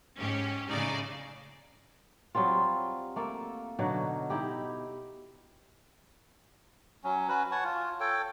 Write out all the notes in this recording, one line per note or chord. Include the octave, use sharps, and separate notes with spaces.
G#2 C#4 G4
A2 C#3 D#4 D5 G#5
F#3 G3 C4 F4
A3 A#3 A4
B2 D3 F#3 D#4
D#4 E4 G4
F#3 C#4
C#4 F#4 B4
C#5 F#5 A5 C#6
F4
A4 C#5 G5